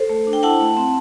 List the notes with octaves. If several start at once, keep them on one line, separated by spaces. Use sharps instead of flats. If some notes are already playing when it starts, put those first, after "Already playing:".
Already playing: A4 C5
A3
D4
G5
E4 F#5 A5
A3
C4